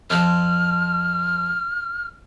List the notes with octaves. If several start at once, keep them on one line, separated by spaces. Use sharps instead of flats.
F2 F3 F6